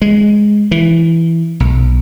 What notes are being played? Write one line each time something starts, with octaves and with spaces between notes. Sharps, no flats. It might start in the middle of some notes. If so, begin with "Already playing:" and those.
G#3
E3
B1